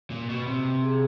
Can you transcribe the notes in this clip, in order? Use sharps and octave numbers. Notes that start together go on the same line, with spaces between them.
A#2
B2
C3
G#4